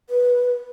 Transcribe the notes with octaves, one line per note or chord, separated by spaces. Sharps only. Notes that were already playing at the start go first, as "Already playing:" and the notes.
B4